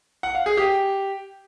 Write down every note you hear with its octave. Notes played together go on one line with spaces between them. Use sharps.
F#5
F5
G#4
G4